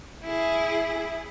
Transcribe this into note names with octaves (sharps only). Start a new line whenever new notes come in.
E4 G#4